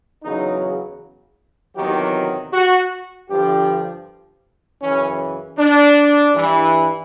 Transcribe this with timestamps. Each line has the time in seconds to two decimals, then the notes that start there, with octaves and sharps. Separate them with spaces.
0.24 E2 C#3 F#3 D#4
1.76 E2 C3 D#3 F#3 G4
2.53 F#4
3.29 G2 D3 F3 G4
4.82 F#2 C#3 E3 C#4
5.59 D4
6.34 G2 E3